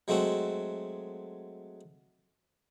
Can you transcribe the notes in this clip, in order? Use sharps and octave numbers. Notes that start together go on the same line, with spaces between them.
F#3 G#3 A3 C4 F#4